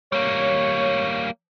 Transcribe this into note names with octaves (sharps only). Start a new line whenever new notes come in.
G3 A#3 C#5